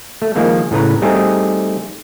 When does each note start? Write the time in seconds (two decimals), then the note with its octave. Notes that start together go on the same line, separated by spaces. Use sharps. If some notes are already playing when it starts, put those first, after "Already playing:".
0.22 A3
0.36 D#3 F3 G#3 A#3
0.71 A2 C#3 B4 A#5
1.02 G3 A3 C4 D#4 G#4 A4